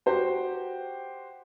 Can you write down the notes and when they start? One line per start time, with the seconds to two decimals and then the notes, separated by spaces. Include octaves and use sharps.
0.06 F#4 G4 C5 G5